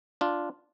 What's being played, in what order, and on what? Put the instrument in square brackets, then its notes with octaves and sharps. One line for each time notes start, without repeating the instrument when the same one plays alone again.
[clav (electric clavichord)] D4 F4